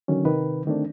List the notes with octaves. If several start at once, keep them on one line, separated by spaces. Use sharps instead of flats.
D3 D#3 F#3 C#4
C3 D#3 B4
D3 D#3 A3 C4 D4